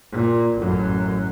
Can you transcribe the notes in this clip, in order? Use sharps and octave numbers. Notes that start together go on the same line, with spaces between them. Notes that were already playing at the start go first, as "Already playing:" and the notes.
A#2
A1 F#2